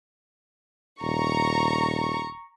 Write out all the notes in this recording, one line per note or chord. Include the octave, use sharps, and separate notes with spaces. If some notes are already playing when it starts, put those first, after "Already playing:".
D#1 A#5 C#6